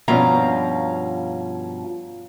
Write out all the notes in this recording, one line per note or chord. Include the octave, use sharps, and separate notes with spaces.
G2 B2 F3 C#4 F5 A#5